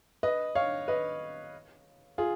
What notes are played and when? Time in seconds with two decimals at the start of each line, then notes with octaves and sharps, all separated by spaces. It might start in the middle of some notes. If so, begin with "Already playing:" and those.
0.23 B4 D#5
0.55 C#5 F5
0.88 B4 D#5
2.18 F4 G#4